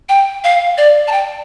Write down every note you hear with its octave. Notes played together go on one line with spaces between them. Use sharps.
G5
F5
D5
A5
G5